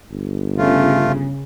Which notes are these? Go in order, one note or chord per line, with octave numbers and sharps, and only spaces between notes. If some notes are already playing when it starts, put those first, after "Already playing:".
G1
C#3 A3 F4